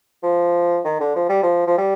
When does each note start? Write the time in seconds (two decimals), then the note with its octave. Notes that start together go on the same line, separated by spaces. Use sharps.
0.23 F3
0.85 D#3
1.00 D3
1.16 F3
1.29 G3
1.43 F3
1.67 F3
1.78 G3